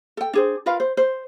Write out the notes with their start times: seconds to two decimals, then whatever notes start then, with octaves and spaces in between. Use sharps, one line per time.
0.17 A4 G5
0.33 D4 G#4 C5
0.66 F4 A#4 B4 F5
0.80 C5
0.97 C5